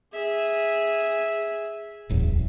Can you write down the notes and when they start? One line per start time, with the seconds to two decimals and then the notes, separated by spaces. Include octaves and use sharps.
0.13 G#4 E5
2.09 D1 A1 E2